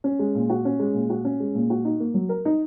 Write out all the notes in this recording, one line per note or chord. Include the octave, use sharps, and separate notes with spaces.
C#4
G#3
A#2
F#4
C#4
G#3
A#2
F#4
C#4
G#3
A#2
F#4
D#4
A#3
F#3
A#4
D#4